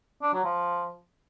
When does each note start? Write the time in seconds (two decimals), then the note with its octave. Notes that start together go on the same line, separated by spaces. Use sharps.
0.22 D4
0.33 F#3
0.44 F3